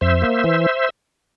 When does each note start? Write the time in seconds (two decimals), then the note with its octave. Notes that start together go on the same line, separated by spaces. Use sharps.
0.01 F2 C5 E5
0.22 A#3
0.44 E3